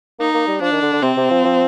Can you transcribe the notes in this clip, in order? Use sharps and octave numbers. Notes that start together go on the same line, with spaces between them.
A#3 D#4
A#3
G3
F3 D4
D#3
D3
D3
C3 C4
C3
F3
F3